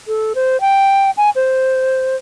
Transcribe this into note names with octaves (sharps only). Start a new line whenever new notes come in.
A4
C5
G5
G#5
C5